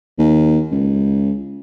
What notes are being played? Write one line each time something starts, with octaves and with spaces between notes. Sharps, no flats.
D#2
C#2